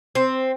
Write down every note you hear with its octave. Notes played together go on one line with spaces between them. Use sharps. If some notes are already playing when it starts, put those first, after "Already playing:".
C4